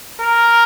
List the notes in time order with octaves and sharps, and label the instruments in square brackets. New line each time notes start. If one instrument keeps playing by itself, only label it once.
[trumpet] A#4